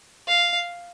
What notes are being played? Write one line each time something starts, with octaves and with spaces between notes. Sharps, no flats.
F5